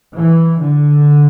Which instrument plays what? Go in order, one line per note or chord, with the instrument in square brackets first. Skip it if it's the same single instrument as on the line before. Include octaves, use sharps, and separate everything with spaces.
[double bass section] E3
D3